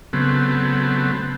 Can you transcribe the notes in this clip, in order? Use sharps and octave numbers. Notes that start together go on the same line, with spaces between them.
C#3 F#3 A3 B3 C4